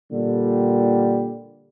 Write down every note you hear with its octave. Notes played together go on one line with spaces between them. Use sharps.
A#2 D3 G3